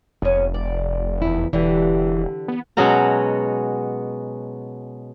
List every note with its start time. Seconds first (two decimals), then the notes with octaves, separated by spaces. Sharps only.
0.22 F1 B3 C#4
0.54 D5
1.22 E2 E4
1.53 E1 D3 E3 G4
2.48 B3
2.77 B2 F#3 G#3 C#4 F#4 A#5